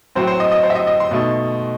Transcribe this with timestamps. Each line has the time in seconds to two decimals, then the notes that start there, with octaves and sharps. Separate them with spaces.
0.15 A2 F#3 C4 C5
0.27 C5
0.40 D#5
0.52 D#5
0.63 C5
0.70 E5
0.75 D#5
0.87 D#5
1.00 C6
1.11 B2 A3 D#4